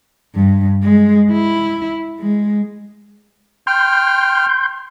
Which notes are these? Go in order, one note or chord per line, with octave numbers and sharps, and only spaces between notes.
G2
G#3
E4
G#3
G5 C6 F6 G6